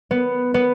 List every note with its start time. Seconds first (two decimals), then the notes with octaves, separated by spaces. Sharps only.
0.11 B3
0.54 B3